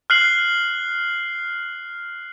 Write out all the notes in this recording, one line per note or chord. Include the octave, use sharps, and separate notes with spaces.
F6 F#6 C7 F#7